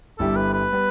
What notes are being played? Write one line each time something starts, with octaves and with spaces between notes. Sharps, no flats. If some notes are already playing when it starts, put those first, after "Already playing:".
G1 G2 G3 E4 G4 A4
B4
B4
G3 B3